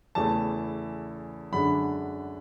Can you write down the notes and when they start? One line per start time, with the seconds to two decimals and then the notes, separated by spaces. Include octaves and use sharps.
0.15 E2 C#3 E3 A3 A5
1.52 F#2 D3 G#3 D4 B5